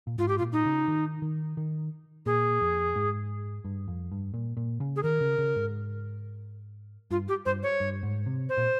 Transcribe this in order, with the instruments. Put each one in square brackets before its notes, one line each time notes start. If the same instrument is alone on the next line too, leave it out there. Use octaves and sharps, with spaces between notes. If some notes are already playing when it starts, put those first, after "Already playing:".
[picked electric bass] A#2
[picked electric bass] G#2 [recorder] F4
[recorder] G4
F4
[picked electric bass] A#2
[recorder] D#4
[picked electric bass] C#3
D#3
D#3
D#3
[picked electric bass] A#2 [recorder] G#4
[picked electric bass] F2
G#2
G2
F2
G2
A#2
A#2
C#3
[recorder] G#4
[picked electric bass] D#3 [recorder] A#4
[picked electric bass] C#3
C#3
G#2
[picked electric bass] G2 [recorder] F4
[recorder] G4
[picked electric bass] G2 [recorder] C5
[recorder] C#5
[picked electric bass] G2
G#2
C3
[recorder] C5
[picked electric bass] A#2